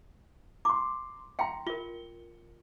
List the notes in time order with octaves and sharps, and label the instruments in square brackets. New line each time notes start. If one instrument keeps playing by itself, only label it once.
[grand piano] A#5 C6 [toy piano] D6
[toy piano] F5 G5 C6 [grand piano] A#5 C#7
[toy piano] F4 A#4 [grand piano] G7